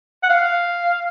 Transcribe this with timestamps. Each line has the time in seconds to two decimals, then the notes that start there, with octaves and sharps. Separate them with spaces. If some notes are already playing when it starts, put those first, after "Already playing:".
0.23 F#5
0.29 F5